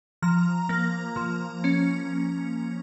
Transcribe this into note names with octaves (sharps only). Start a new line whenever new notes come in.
F3 A#5
A#3
F3
C#4